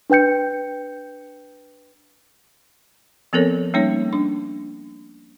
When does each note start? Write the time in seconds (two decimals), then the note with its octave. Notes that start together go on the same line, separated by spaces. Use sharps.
0.10 D4 B4 G5 G6 C#7
3.33 F3 B3 C4 A4 A#4 C#5
3.74 G3 A#3 C#4 D#4 C#5
4.13 D4